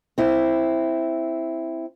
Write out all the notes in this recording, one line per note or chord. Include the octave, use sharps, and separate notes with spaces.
C4 E4